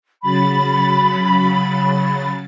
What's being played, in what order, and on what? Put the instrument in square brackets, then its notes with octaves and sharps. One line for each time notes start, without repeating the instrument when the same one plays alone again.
[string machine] C#3 F#3 A6 [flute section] B5